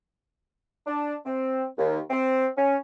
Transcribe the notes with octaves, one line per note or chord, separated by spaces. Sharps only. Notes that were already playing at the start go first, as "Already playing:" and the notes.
D4
C4
D#2
C4
C#4